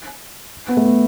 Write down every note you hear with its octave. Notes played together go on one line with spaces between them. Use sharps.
B3
A3
B3